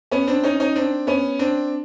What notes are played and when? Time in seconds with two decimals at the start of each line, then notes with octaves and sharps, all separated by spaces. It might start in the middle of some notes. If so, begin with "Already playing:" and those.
0.12 B3 C#4
0.27 C4 D4
0.43 C#4 D#4
0.60 C#4 D#4
0.76 C4 D4
1.07 B3 C#4
1.39 C4 D4